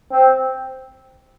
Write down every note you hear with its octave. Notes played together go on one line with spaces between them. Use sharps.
C4